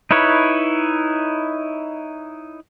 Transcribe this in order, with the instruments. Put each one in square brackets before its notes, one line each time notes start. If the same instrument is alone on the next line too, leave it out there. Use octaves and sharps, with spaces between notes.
[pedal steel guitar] D#4 E4 B4 C#5